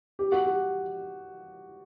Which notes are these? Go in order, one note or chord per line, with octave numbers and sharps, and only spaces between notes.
G4
F#4
G4